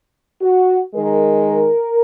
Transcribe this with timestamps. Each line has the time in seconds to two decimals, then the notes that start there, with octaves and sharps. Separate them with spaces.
0.41 F#4
0.95 D#3 G#3 A#4